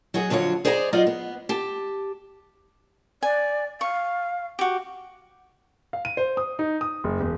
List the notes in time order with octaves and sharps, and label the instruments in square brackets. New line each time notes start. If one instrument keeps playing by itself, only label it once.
[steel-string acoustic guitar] F#3 D#4 F#4 G#4
F2 D3 F#3 F4 C#5
G#4 C5 D5 D#5 G5 A#5
F#3 D#4 F4 D5 D#5 F5
B3
G4 A5
[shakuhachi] D5 [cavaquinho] G#5
[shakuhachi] F5 [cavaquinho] C#6
[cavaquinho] F#4 G4
[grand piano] F5
D#7
C5
D#6
D#4
D#6
F#1
E1